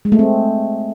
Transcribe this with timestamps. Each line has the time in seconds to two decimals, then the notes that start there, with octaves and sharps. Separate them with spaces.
0.05 G#3
0.12 A3
0.19 C4